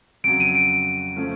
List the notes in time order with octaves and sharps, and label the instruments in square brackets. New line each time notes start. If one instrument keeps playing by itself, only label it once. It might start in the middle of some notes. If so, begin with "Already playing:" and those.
[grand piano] F2 [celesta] D7
[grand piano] C#3 F#3
[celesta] D#7
D7
[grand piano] C#3 F3 A3 C#4